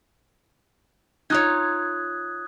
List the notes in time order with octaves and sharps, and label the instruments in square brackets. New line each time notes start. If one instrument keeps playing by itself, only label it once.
[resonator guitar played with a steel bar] D#4 F4 C#5 [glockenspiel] D#6 F#6 G#6